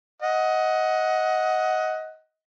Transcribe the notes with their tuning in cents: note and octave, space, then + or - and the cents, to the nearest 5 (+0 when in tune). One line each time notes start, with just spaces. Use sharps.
D#5 +20 F#5 +0